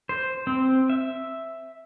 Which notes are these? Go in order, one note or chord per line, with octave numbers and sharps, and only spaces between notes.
C5
C4
E5